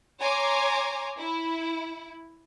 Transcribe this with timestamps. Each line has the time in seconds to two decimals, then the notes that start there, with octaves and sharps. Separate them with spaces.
0.20 C#5 G#5 A#5 C6 D6
1.18 E4